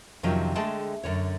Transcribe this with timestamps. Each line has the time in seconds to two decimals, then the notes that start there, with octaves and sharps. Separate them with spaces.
0.23 F2 C3 D#3 F3 F#3 C#4
0.56 D3 G#3 A3 G#4 G5 A5
1.03 F#2 D3 C#5